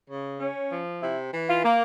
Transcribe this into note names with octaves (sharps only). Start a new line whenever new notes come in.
C#3
C#4
F3
C3 E4
E3
F4
A#3